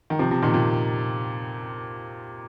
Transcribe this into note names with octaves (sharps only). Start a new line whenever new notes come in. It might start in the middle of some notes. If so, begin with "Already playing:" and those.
D#3
C3 F3
C3 F3
A#2 D#3
A#2